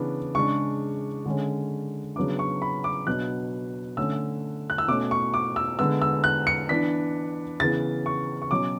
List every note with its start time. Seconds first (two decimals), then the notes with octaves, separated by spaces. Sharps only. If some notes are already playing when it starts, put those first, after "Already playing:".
Already playing: C#3 E3 B3 D4
0.35 C#3 G#3 D4 C#6
1.26 D3 G#3 C#4
2.16 C#3 F#3 B3 D4 D6
2.39 C#6
2.62 B5
2.84 D6
3.07 B2 F#3 B3 D4 F#6
3.97 D3 A3 C#4 E6
4.70 F#6
4.78 E6
4.88 B2 A3 C#4 D6
5.11 C#6
5.34 D6
5.56 E6
5.79 D3 G#3 B3 E6
6.02 E6
6.24 F#6
6.47 C#7
6.69 E3 B3 D4 B6
7.60 C#3 E3 B3 A6
8.06 C#6
8.42 C#6
8.51 B2 F#3 C#4 D6